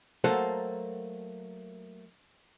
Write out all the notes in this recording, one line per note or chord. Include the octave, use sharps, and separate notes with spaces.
F#3 A3 A#3 A4 C5 F#5